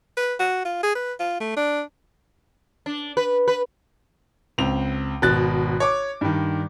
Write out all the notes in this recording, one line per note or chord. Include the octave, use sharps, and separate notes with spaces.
B4
F#4
F4
G#4
B4
F4
A3
D4
D4
B4
B4
C#2 C4 F7
G#1 B2 F#6 A6
C#5 D6
G2 D#3